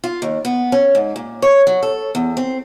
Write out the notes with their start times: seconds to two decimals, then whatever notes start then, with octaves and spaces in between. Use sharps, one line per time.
0.04 F4
0.22 D#2
0.45 B3
0.72 C#4
0.95 G#2
1.16 A#2
1.42 C#5
1.67 F#3
1.83 A4
2.15 E2
2.37 C4